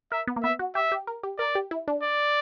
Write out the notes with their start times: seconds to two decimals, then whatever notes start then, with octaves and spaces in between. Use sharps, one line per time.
0.12 A#4 E5
0.27 B3
0.36 A#3
0.43 B3 E5
0.59 F#4
0.75 G4 E5
0.92 G4
1.07 A#4
1.23 G4
1.39 A#4 D5
1.55 G4
1.71 E4
1.88 D4
2.03 D5